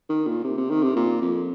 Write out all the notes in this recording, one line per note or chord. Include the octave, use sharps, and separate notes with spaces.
D#3
A#2
C3
C3
D#3
C3
A#2
F2